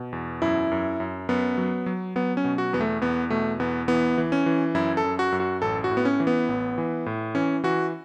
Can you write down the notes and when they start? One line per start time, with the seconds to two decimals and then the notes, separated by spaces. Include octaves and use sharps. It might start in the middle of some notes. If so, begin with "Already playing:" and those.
Already playing: B2
0.13 E2
0.42 F#2 E4
0.71 F#2
1.00 F#2
1.29 F#2 B3
1.57 F#3
1.86 F#3
2.16 F#3 B3
2.37 C#4
2.44 B2
2.58 F#4
2.73 E2 B3
2.81 A3
3.01 E2 B3
3.30 B2 A3
3.60 E2 B3
3.88 E3 B3
4.18 E3
4.32 C#4
4.46 E3
4.75 F#2 E4
4.97 A4
5.04 F#2
5.19 F#4
5.32 F#2
5.40 F#4
5.62 A1 A4
5.84 F#4
5.91 A2
5.97 B3
6.05 C#4
6.20 E3
6.27 B3
6.49 A1
6.78 E3
7.06 A2
7.35 E3 C#4
7.64 E3 F#4